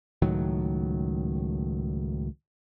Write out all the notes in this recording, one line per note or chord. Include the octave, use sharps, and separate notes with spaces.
C#2 A2 D#3 F#3